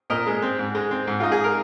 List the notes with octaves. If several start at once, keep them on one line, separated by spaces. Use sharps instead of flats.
A#2 A#4 D#5
G#3
C4
G#2
G#3
C4
G#2
D#4 F4
G#4
A#4